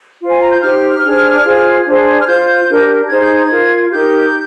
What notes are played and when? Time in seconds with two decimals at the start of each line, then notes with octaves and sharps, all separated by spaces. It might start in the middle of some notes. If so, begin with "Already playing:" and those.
0.21 F4 C5
0.31 G#5
0.41 A#5
0.52 G6
0.62 D#4 G4 C5 F6
1.03 D4 G#4 C5
1.44 F4 G#4 C5
1.85 D4 G#4 C5
2.21 F6
2.27 F4 C5 G6
2.68 D4 G4 A#4
3.09 D#4 G#4 C5 G#6
3.22 G6
3.36 G#6
3.51 F4 A#4
3.92 D#4 G4 A#4 G6